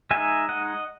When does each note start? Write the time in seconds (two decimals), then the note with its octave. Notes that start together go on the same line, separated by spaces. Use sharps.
0.11 G#3 D#4 E5 G#5
0.49 D#5 F#5